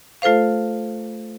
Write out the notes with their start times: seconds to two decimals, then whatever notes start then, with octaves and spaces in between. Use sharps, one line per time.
0.22 A3 F4 A4 C5 F5